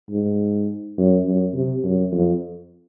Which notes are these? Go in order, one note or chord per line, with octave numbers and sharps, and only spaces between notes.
G#2
F#2
F#2
C3
F#2
F2